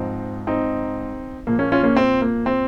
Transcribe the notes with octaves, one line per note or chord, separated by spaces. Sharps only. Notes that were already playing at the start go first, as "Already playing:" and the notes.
Already playing: G#2 F3 C4 D#4
C4 D#4
A#2 F3 A#3
A#3 C#4
C#4 F4
A#3 C#4
C4
A#3
C4